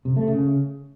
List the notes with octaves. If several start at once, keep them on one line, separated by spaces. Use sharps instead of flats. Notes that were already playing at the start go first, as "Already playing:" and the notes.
C3
A3
C#3